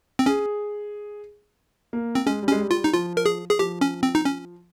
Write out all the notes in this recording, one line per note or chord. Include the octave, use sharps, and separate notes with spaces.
C4
C#4 G#4
A#3
C4
G#3 C#4
G3
G#3 C#4
G3
F4
G3
D#4
F3 F4
A#4
G#4
G#4
F3 G4
C#4
C4
D#4
C#4